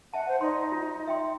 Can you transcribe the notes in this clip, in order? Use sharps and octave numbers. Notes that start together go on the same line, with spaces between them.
E5 F#5 A5
C5
D#4 D5 C6
F4
E5 G5 C6